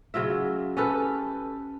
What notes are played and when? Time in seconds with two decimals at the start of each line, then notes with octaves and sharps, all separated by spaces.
0.14 C#3 F#3 F4 E5
0.77 C#4 G4 A4 B4